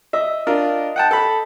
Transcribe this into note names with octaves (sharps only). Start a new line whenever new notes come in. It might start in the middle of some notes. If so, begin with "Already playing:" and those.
D#5 E5
D4 F4 A#4
F#5 G5 A5
A4 B5